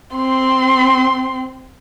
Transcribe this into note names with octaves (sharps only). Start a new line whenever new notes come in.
C4 C6